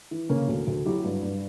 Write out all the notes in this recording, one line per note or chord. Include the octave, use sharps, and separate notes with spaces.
E3
C#3 A#3 C#4
D2
D2
F#3 E4 G4
G2
G2